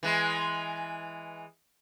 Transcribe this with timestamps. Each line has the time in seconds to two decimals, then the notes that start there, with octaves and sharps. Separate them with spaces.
0.03 E3 G#3